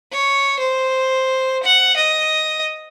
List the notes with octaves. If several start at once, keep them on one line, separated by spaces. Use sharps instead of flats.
C#5
C5
F#5
D#5